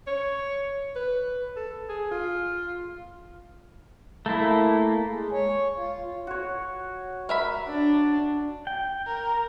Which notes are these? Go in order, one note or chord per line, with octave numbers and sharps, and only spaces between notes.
C#5
B4
A4
G#4
F4
A3 A#3 E4
G#3
C#5
F4
F#4 C#5
A#4 E5 B5
D4
G5
A#4